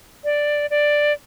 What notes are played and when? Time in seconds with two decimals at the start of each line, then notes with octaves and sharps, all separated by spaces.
0.24 D5
0.70 D5